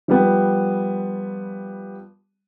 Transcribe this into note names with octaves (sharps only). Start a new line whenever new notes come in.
F3 G3 B3